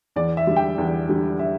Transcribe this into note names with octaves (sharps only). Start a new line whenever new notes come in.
E2 D5
E5
D3 G3
G5
E2
D3 G3
E5